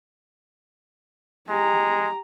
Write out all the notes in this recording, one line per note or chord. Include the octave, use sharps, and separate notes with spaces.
G#3 G4 A#5